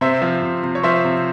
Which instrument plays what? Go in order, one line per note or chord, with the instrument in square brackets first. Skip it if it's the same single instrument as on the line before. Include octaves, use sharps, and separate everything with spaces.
[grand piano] C3 C5 E5
F3
C3
C3
C#5
F3 C5 E5
C3